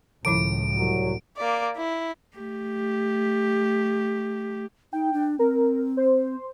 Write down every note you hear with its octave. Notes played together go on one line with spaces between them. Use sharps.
C#2 A2 D#3 F3 E4 D7
C2 F#3
A#3 D5
E4
A3 G4
D#4 G5
D4
C4 A#4
C5